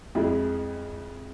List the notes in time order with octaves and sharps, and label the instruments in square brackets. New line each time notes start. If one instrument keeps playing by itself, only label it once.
[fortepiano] F2 G#3 E4 G#4